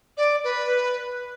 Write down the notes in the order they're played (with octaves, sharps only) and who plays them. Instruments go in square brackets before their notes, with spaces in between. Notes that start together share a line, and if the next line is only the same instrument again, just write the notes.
[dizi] D5
B4